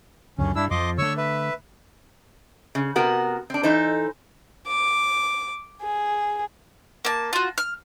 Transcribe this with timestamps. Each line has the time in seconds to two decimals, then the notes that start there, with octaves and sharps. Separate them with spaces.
0.38 C#2 F#2 D3 C#4
0.56 G2 D4 E4 E6
0.71 F2 F3 D#5 C6 D6
0.98 D3 A3 C#5 C#6 E6
1.17 B4 E5
2.75 C#3
2.96 C3 B3 F#4 A#4
3.50 C4 D4
3.63 E3 D#4 A4 C5
4.68 D6
5.82 G#4
7.05 A#3 A5
7.33 F4 F#4
7.58 F6